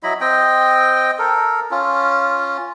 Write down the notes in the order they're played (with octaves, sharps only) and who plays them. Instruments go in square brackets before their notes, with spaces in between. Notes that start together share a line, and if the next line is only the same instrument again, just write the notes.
[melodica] F#3 E4 D#5 B5
C4 D#5 G5
A4 A#4
C#4 F4